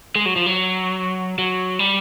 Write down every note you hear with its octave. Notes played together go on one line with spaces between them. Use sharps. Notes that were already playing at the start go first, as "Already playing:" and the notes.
G#3
F#3
F3
F#3
F#3
G3